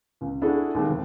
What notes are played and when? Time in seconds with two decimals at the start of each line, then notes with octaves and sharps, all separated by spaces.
0.21 C#2
0.42 D4 E4 F#4 G#4 A4
0.74 D#2 G3 G#3 C4
0.89 F1